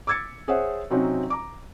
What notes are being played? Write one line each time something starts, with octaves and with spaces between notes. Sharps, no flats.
D6 E6 G#6 A6 C#7
G#4 C5 C#5 E5 F#5
C3 F#3 C4 C#4 D#4 F#4
A#5 D6